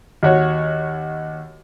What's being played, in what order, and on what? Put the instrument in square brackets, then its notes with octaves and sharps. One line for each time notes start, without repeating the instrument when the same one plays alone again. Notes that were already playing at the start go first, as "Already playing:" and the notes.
[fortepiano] D#2 F#4 C#5